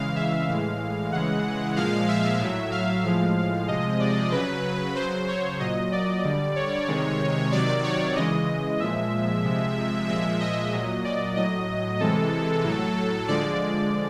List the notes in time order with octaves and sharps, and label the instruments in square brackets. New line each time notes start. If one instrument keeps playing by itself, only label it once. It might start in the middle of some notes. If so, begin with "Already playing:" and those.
Already playing: [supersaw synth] C#3 E3 G#3 F5
E5
A2 E3 G#3 F5
C#3 E3 G#3 F#5
A#2 F3 G#3 F5
E5
A2 F#3
F5
A2 F3 G#3 F5
C3 F3 G#3 D#5
D5
C#3 F#3 B4
C#3 F#3 C5
C#5
A#2 F#3 D#5
D5
D3 G3
C#5
C3 D#3 G#3
C3 D#3 F#3 D5
C#5
C#3 E3 G#3 D#5
A#2 F3 G#3 E5
C3 F3 G#3
A#2 F3 G#3 E5
D#5
A#2 F#3
D5
A2 F#3 D#5
C3 E3 G#3 A4
A2 F#3
D3 F3 G#3 D5